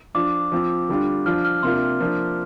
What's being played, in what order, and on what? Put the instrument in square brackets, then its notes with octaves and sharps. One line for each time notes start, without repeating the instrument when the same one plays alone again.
[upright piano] F3 D4 F4 [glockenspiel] D6
[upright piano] F3 C4 F4
D3 G3 D4 F4
[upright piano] F3 D4 F4 [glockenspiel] F6
[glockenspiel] F6
[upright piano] C3 A#3 D4 F4 [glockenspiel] C6
[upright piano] F3 A#3 D4